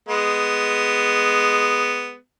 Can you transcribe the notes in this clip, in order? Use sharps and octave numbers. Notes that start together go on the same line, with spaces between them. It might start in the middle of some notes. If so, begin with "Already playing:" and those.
G#3 B3